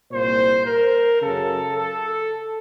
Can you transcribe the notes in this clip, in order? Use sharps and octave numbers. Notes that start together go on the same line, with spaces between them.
C2 A#2 C5
A#4
F#2 C#3 A4
A4